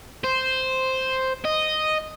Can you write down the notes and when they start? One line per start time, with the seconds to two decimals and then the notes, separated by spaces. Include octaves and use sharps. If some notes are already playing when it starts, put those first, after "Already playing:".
0.24 C5
1.45 D#5